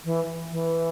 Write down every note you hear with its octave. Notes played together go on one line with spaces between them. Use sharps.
E3
E3